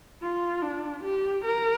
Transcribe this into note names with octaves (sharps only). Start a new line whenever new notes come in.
F4
D4
G4
A#4